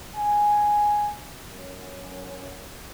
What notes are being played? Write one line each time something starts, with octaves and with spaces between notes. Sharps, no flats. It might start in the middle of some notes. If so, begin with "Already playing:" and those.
G#5
F#2